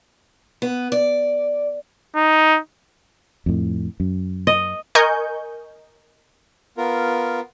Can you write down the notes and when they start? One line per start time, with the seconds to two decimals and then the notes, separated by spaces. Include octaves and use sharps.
0.62 B3
0.92 D5
2.16 D#4
3.46 F2 A2
4.00 F#2
4.47 D#5
4.95 A#4 D#5 G#5 C#6 G6
6.78 B3 F4 A#4